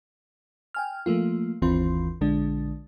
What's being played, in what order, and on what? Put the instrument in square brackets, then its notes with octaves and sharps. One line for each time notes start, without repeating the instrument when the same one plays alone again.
[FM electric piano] G5 G#5 F6
F3 A3 A#3 F4
G1 D#2 E3 C4 F4 C6
A#1 D3 G#3 D4